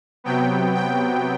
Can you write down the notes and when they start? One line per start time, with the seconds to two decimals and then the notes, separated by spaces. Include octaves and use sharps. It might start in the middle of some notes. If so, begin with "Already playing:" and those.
0.24 C3 F#3 B3 G5
0.75 G5